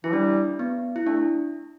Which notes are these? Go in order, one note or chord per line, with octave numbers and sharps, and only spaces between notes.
E3 E4
G3 D4
B3
E4
A3 D4